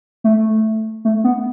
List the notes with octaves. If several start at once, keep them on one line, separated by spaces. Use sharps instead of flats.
A3
A3
B3